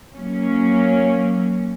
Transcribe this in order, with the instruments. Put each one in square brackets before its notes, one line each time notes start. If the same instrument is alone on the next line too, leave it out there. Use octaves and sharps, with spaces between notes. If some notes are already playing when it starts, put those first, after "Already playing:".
[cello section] F#3 A#3 C#4